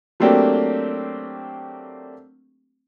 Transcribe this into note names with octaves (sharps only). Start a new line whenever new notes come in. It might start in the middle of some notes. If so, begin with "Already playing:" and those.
F#3 A3 A#3 C4 D4 G4